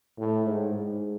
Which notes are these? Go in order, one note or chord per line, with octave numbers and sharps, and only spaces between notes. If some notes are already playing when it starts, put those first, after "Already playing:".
A2
G#2
G#2